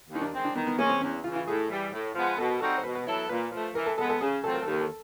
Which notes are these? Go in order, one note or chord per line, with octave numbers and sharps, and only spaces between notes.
D#2
D#4
D4
D#3 G#3 C4
D4
D#3 B3
B3
G#3 A#3 C#4
C4
E2 C#4
C#3 E3 F4
F4
A2 G#4
E3 G3
A2
F3 G#3 B3
B2 A4
A#4
G3 C4 D#4 F#4 A4
C5
B2 B4
B4
F#3 B3 E4 A4 C#5
A#2 B4
F3 A3
E3 A#4
A4
G#3 B3 A4
A4
C#3 G#4
F#3 A3 C4 F4 A4
A#4
A4
D#2
A#4
A4